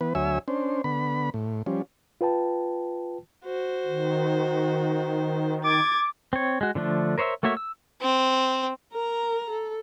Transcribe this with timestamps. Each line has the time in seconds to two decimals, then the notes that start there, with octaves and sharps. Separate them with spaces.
0.01 E3 B3 B4
0.15 D2 F#3 C#5 E5 G#5 E6
0.48 C#4 D4 C5
0.84 D3 B3 B5
1.34 A2
1.66 F3 G3 C#4
2.21 F4 B4 G5 A5
3.45 F#4 C5
3.86 D#3
5.64 D6 G#6 A6
6.33 C4 C#5
6.61 G#3 F#4
6.75 D3 F3 A3 D4
7.18 A#4 C5 C#5 D#5 E5
7.43 A3 A#3 F#4 C#5 E5
7.57 E6
8.01 C4
8.92 A#4 A#5
9.50 A4